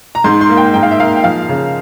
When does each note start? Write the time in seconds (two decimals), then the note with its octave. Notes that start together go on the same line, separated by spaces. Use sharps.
0.15 A#5
0.24 G#2 C6
0.41 C6
0.49 A#3
0.57 G5
0.74 G#2 G5
0.83 F5
0.91 E5
0.99 A#3 F5
1.16 G5
1.24 F3 F5
1.49 C#3